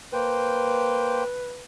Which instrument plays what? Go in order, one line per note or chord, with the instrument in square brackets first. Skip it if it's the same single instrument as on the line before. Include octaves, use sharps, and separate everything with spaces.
[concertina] A#3 C5 G5 [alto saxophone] B4